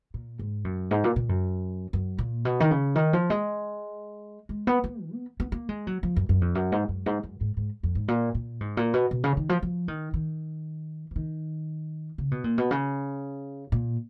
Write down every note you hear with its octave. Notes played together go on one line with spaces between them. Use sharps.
A#2
G#2
F#2
G#2
A#2
A#2
F#2
F#2
A#2
B2
D#3
C#3
D#3
F3
G#3
G#3
B3
B3
D#3
B3
B3
A#3
G#3
F#3
F3
F#2
F#2
F2
F#2
G#2
F#2
G#2
F#2
G#2
G#2
F2
G#2
A#2
A#2
G#2
A#2
B2
B2
C#3
D#3
F3
F3
D#3
D#3
F3
D#3
C#3
B2
A#2
B2
C#3
A#2